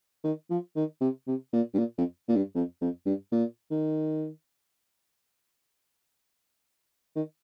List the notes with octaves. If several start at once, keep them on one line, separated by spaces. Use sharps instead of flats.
D#3
F3
D#3
C3
C3
A#2
G2
A#2
F2
A#2
G2
F2
F2
G2
A#2
D#3
D#3